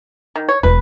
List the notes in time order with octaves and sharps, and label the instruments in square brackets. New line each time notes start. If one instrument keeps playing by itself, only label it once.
[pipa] D#3
C#5
[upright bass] E1 E2 [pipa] B4